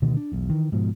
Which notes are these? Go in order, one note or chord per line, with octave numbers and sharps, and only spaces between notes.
D2 B2 D3 D#3
D4
E1 B1
D#3 E3
G#2 B2 F3